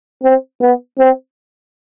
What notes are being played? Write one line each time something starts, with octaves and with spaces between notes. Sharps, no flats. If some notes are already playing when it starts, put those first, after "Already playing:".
C4
B3
C4